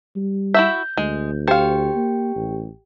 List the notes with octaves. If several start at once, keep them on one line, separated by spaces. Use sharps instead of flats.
G3
E4 F#4 E5 G6
D2 G#3
G4 C5 F5 G5
A#3
A1